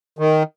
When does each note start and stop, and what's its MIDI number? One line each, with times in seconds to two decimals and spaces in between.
0.19 0.43 51